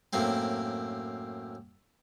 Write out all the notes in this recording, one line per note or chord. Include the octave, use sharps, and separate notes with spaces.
F#2 A2 A#3 C4